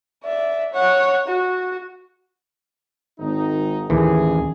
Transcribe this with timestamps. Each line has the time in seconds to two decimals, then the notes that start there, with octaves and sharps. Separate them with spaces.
0.24 D5 E5
0.73 C#5 F#5
1.28 F#4
3.20 G#1 D#4
3.90 A1 D#2 E3 G#4